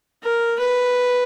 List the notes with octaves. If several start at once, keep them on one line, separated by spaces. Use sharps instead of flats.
A#4
B4